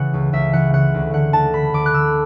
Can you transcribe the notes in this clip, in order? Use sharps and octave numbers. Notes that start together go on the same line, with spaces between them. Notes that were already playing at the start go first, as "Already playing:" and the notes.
Already playing: C#3 E3 F#5
C#2
C#2 E5
E3 F#5
C#3 F#5
D2
D3 F#5
D2 A5
D3 B5
D2 D6
F#6
D3 E6